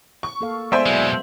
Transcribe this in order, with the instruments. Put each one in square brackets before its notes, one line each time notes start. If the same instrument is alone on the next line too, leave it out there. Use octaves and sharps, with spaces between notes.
[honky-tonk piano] C#6
[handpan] A#3 A4 F5
[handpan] G#3 B3 [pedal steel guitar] E4 D5 G#5 [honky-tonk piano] C5 E5
[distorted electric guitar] B2 G#3 [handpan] F#3